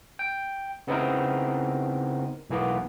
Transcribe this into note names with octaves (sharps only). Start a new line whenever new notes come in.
G5
C#3 B3 C4 D#4 E4 A#4
B1 E3 A#3 B3